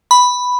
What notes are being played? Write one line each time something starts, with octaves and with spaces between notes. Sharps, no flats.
B5